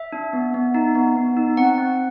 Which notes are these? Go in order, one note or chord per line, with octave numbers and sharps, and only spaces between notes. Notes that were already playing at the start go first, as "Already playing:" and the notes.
Already playing: E5
D4
B3
B3
D#4
B3
B3
D#4
C4 F#5
C4